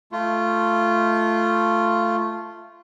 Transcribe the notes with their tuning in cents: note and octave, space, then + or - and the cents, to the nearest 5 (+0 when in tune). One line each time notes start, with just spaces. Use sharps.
A3 +0 F4 -15